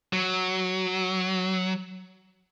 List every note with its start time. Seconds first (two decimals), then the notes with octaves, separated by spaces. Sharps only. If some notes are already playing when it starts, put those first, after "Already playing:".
0.13 F#3